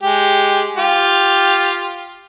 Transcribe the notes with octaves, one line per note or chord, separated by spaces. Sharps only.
G#3 G4
F4 G4